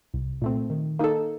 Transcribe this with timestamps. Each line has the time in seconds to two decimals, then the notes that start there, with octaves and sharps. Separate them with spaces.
0.14 C2
0.41 A#2 A3 C4
0.70 D#3
0.99 A#3 D#4 A4